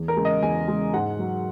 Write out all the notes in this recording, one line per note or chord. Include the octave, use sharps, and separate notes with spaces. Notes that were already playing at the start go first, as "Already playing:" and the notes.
Already playing: E2
A#4
C#3 G#3
D#5
E2 G#5
C#3 G#3
G#2 F#5
F#3